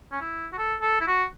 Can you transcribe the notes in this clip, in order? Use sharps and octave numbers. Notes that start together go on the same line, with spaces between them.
C#4
E4
F#4
A4
A4
E4
F#4